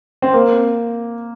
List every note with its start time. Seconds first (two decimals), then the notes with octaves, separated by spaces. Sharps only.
0.22 C4
0.33 A#3